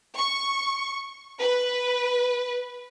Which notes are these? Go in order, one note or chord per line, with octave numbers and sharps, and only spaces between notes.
C#6
B4